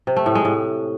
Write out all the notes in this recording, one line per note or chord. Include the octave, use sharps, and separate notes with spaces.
C3
A3
A2
G#3
A2